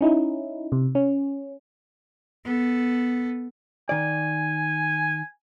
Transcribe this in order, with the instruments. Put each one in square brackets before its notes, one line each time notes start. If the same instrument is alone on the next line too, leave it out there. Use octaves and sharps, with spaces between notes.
[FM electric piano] C#4 D#4 E4
C3
C#4
[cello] B3 A4
[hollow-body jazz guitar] D#3 D5 [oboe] G#5